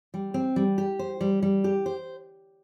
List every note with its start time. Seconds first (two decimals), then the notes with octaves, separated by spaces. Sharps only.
0.14 G3
0.34 C4
0.56 G3
0.78 G4
0.99 C5
1.21 G3
1.42 G3
1.64 G4
1.86 C5